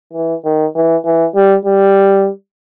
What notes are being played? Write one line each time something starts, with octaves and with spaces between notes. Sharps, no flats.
E3
D#3
E3
E3
G3
G3